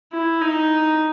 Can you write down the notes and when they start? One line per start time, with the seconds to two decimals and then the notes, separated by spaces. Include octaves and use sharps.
0.13 E4
0.41 D#4